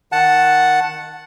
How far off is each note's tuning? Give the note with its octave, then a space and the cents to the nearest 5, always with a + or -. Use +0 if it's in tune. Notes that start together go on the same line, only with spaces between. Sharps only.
D#3 +0 F#5 +0 A5 +0